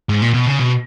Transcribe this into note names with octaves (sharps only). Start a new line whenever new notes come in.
G#2
A#2
B2
C#3
B2